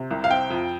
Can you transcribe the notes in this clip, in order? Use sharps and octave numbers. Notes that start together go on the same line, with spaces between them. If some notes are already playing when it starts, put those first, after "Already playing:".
Already playing: C3
C2
F5
C4 G5
F2